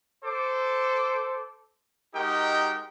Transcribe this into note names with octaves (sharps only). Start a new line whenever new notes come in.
A4 C5 D6
G#3 D#4 F#4 G4 A#4 G5